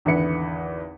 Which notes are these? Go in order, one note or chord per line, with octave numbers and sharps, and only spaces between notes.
G#1 E2 D3 E4 B4 C#7